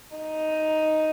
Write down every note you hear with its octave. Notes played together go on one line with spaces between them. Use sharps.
D#4